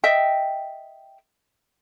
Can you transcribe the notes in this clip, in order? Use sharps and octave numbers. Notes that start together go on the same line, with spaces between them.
D#5 E5 G5